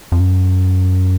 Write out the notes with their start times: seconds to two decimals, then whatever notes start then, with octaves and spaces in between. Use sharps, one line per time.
0.12 F2
0.20 F#2